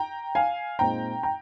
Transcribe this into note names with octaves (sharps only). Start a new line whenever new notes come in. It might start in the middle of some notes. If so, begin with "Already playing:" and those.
Already playing: G5 A#5
F5 G#5
A#2 G#3 C4 D#4 G5 A#5
G5 A#5